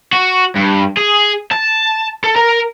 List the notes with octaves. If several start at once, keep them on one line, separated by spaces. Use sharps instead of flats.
F#4
G2
G#4
A5
A4
A#4